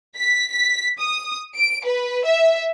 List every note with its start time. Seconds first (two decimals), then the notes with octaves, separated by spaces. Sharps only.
0.17 B6
0.51 B6
0.98 D#6
1.54 D7
1.85 B4
2.25 E5